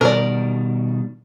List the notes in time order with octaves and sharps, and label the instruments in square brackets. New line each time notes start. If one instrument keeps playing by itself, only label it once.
[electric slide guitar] B2 D#3 G3 [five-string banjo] A#4 D5